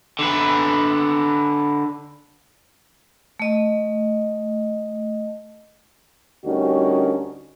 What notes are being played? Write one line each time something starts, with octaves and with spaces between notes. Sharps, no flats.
D3 B4
A3 D#5
D2 G3 C#4 D#4 F#4 A#4